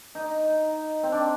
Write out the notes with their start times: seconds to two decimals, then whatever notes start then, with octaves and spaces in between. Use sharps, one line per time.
0.15 D#4
1.03 C4
1.12 D4